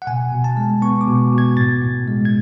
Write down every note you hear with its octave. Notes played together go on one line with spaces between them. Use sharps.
F#5
B2 G#5
B2
A5
G#3
B3 C#6
D6
B2
B2
G#6
A2 A6
A2
G#3
G#6